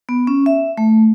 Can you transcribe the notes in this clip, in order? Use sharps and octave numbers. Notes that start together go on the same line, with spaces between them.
B3
C#4
E5
A3